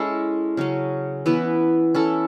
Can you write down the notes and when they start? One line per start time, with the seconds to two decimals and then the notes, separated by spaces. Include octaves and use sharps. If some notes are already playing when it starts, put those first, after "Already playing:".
Already playing: G#3 C#4 E4 A4
0.57 C#3 F#3 C#4
1.26 E3 B3 E4 B4
1.94 C#4 E4 A4